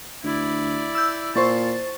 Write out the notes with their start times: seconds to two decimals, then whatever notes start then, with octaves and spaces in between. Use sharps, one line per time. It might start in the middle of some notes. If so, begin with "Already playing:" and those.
0.24 D2 E4 D5
0.95 E6 G6
1.35 A#2 C5 A5 C#6 A6